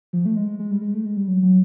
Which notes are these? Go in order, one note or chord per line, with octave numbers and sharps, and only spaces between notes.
F3
A3
G#3
G#3
G3
G#3
A3
G#3
G3
F#3
F#3